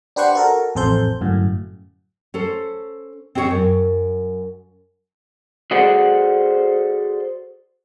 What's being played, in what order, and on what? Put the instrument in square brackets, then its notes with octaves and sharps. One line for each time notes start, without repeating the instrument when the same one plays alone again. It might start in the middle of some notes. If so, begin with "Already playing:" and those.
[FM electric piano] D4 G4 B4 C5 F#5 C#6
F#4 A4 A#4
A1 F2 A4 C5 G6
G1 F#2 A2
[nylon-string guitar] C#4 A4 C5
C4 C#4 G#4 B4 C#5
F#2
[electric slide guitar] F#4 G#4 A4 C5 D5 F#5